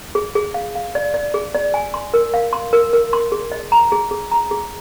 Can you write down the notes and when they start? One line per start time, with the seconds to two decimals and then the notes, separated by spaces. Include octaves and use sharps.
0.15 G#4
0.35 G#4
0.54 F5
0.75 F5
0.95 D5
1.14 D5
1.34 G#4
1.54 D5
1.74 G#5
1.94 C6
2.14 A#4
2.34 F5
2.53 C6
2.73 A#4
2.93 A#4
3.13 C6
3.32 G#4
3.52 D#5
3.72 A#5
3.92 G#4
4.11 G#4
4.31 A#5
4.51 G#4